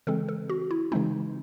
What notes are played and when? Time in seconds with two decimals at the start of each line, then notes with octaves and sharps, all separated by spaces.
0.07 C#3 E3 G#3 C4 A4
0.29 A4
0.50 F#4
0.71 E4
0.92 C#3 E3 G#3 C4 D#4